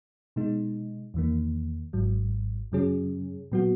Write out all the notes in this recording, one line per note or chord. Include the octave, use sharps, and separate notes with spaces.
B2 G#3 D#4
E2 D#3 A#3
G#1 G#2 F#3
F#2 C#3 F#3 C#4 G#4
A#2 F#3 B3 F#4